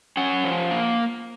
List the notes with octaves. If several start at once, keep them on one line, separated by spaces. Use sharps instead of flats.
C#4 F#5
F3
A#3